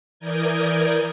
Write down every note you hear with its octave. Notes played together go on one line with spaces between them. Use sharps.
E3 A#4 D5 D#6 G6 G#6